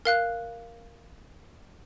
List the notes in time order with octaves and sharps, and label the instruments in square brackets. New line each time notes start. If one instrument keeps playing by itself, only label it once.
[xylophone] A#4 F5 F#6